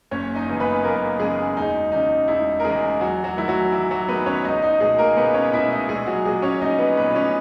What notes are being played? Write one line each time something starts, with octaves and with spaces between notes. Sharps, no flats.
F#1 C#4 C#5
D#4 D#5
F#2 C#3 E3 G#3
B3 B4
F#1 A#3 A#4
F#2 C#3 E3 G#3 G#4
E1 D#4
E2 C#3 D#4
E1 E4
A#4
E2 C#3 G#3 G#4
E2 F#3 F#4
F#3 F#4
D#3 G#3 E4
F#3 F#4
E2 E4
F#3 F#4
D#3 G#3 B3 B4
C#4 C#5
C#2 D#4 D#5
D#4 D#5
B2 G#3 G#4
A#3 A#4
C#2 B3 B4
C#4 C#5
B2 G#3 E4 E5
D#4 D#5
A#1 G#3 G#4
F#3 F#4
A#2 F#3 G#3 G#4
C#4 C#5
A#1 D#4 D#5
B3 B4
A#2 F#3 B3 B4
C#4 C#5